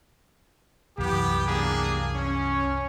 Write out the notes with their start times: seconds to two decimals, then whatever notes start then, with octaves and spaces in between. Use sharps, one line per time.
0.98 C2 F#2 E3 B3 G4
1.47 A#3 D4 G#4
2.15 C#4